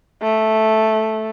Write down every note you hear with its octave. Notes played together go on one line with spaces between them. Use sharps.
A3